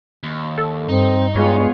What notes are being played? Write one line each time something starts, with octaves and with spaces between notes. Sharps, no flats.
D#2
A4
G2 C4 D#4
G2 G#3 B3 F4 C#5